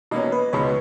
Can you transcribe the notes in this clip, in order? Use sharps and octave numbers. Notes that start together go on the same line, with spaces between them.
B2 A#3 C#4 D#5
B4
C#2 B2 G#3 B3 C#5